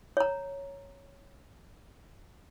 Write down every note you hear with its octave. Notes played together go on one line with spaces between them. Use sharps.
C#5 A#5